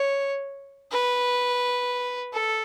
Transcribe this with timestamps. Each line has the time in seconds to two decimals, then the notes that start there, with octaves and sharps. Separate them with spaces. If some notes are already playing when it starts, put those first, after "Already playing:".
Already playing: C#5
0.92 B4
2.34 A4